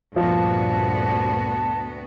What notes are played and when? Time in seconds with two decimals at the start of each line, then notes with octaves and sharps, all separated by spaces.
0.16 D2 G2 A#2 F3 B3 F#4 A5